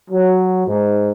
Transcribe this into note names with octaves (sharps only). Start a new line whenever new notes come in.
F#3
G#2